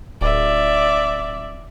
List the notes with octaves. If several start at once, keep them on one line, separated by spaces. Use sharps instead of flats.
D1 D5 E5